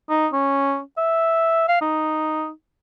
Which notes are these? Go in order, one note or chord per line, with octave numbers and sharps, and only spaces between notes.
D#4
C#4
E5
F5
D#4